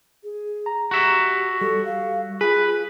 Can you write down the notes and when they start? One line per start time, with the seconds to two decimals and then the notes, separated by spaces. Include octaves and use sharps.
0.24 G#4
0.66 A#5
0.91 F#4 G4 E5
1.61 G3 A4
1.85 F5
2.41 F4 G#4 B4